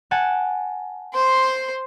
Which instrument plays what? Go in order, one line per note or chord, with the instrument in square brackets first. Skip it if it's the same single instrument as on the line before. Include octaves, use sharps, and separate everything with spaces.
[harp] F#5 G#5 A5
[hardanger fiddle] C5 C6